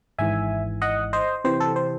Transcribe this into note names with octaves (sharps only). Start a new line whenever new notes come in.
G#1 G#2 E3 E5 G#5
D#5 F#5
C5 D#5
C3 E3 C4 C5
A4
C5